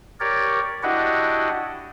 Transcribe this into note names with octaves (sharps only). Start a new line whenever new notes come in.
G4 A#4 C#5 D5
D4 E4 F#4 G4 D#5 F#5